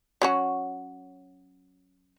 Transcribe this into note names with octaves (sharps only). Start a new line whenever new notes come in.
F#3 C#4 F#4